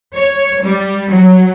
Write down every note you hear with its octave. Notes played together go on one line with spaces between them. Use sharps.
C#5
G3
F#3